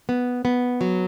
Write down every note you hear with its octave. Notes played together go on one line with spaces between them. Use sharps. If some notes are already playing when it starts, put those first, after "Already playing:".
B3
B3
F#3